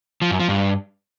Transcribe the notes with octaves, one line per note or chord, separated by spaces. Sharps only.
F3
F#2
F3
G2